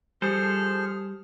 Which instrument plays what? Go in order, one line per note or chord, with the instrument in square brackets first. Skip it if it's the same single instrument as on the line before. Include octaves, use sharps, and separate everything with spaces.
[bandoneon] F3 G#4 F6 [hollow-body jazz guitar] G3 [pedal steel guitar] A4 C5